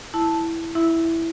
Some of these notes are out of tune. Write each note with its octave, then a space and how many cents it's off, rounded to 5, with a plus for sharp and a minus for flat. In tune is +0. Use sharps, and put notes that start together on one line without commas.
E4 +0 A5 +0
E4 +0 E5 +0